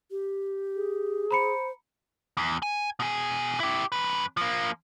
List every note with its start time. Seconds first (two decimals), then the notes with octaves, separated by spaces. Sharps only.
0.11 G4
0.76 G#4
1.31 C5 A#5 B5 C#7
2.37 E2
2.62 G#5
3.00 B2 G#4
3.60 E4 G4
3.92 F#2 B4
4.37 F3 A#3